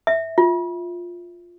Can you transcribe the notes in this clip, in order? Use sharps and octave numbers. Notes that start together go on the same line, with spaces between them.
E5
F4